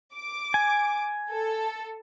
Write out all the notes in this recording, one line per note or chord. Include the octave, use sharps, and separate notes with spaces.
D6
G#5
A4